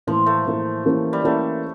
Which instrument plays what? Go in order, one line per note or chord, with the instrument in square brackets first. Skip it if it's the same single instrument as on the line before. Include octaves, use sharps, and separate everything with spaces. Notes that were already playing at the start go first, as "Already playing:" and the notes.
[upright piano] A2 E3 A#3 E4 A#4 [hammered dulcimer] F3
[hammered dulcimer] A3
[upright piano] A2 E3 A#3 E4 A#4
E3 A#3 C#4 G4
[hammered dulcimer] G3
[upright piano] E3 A#3 C#4 G4 [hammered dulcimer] A3